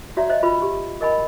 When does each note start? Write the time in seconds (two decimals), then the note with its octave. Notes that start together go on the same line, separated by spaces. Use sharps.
0.17 F#4 C#5 D5 E5 A#5
0.30 C5 D#5 E5
0.43 F4 B4 B5
0.62 G4
1.01 A#4 D#5 G#5 B5